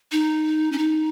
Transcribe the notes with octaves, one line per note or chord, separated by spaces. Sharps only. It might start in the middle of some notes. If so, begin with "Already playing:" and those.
D#4
C#4
D#4